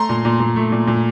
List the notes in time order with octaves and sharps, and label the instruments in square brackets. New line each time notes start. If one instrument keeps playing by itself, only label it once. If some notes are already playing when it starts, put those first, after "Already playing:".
Already playing: [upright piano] A3 A#5 C6
A#2
A#2
A#2
A3
A#2
A#2